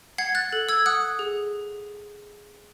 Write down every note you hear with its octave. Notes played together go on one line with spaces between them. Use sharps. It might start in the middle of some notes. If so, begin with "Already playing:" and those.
F#5 G#6 C7
F#6 A6
A4
E6 G#6
F#5 D#6 F#6
G#4